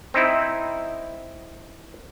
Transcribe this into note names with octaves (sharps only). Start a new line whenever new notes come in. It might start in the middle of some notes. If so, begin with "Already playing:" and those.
C4 D#4 E4